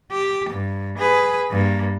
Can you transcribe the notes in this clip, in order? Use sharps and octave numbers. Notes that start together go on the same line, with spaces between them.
G4
G2
G#4 B4
G2 A#3